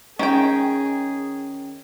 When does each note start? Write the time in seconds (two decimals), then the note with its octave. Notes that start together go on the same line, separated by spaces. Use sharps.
0.19 D#3 C#4 G#4 G5